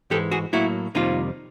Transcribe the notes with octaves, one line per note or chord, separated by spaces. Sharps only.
G#2 E3 G#3 G4 A4
F#4 G#4
A2 F#3 A#3 E4 F#4
F2 C3 D#3 G3 A#3 D#4 F4